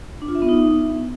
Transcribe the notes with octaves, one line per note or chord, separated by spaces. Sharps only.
D4
F4
E5
B3
D#4